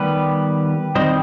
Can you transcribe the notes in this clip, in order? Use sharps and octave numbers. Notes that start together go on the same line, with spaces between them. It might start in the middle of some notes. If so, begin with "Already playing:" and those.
Already playing: D#3 G3 B3 G4 B4
D#3 G3 C4 C5 D#5